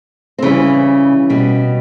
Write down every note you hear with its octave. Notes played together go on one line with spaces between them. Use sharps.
C4
C#3 E3 G3 C#4
B2 G3